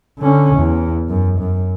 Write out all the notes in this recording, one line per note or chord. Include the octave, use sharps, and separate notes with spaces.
D3 C#4
E2
F#2
F#2